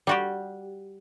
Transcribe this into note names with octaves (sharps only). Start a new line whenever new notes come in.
G3 F#4 G4